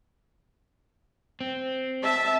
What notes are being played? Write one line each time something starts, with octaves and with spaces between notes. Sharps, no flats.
C4
E5 A5